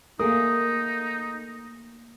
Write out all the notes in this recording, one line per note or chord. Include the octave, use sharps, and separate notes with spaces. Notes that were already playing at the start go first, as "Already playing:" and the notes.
A3 A#3 D#4 G#4 A#4 D#6